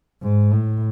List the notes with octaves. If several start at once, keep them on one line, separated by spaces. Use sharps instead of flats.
G#2
A2